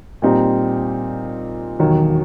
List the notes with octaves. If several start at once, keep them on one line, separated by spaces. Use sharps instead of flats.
A#2 G3 C4 D#4 G4
E1 D#2 D#3 F#3